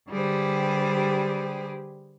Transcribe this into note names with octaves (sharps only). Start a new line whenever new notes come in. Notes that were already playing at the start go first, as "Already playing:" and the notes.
D3 G3 G4 G#4 B4 C5